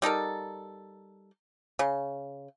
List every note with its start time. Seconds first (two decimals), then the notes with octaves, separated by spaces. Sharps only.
0.02 G3 D#4 A4 A#4
1.79 C#3